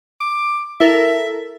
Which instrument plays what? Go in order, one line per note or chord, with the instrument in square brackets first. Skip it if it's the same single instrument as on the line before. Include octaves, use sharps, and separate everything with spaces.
[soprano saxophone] D6
[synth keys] E4 A4 A#4 [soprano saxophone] E5